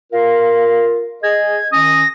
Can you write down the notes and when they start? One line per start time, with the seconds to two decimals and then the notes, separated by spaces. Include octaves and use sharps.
0.12 F4 A#4 F5
1.23 G#4 D#5 G#6
1.72 D#3 C#4 D#6 A#6